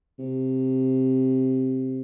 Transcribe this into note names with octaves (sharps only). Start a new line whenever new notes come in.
C3